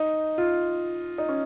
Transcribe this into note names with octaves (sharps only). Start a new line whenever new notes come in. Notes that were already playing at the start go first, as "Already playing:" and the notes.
Already playing: D#4
F4
D#4
C#4